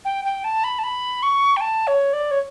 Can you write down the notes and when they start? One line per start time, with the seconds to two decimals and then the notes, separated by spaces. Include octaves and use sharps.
0.04 G5
0.24 G5
0.44 A5
0.63 B5
0.78 A5
0.83 B5
1.22 C#6
1.56 G5
1.60 A5
1.87 C#5
2.13 D5
2.30 C#5